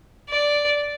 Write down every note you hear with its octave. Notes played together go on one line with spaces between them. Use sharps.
D5